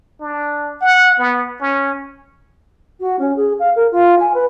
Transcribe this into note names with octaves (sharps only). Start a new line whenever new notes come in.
D4
F#5
B3
C#4
F#4
C#4
G#4
F5
A#4
F4
G#5
B4